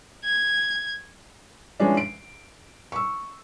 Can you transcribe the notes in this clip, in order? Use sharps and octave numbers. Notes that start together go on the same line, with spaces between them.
G#6
E3 F3 G#3 C#4 D4
D7
C#6 E6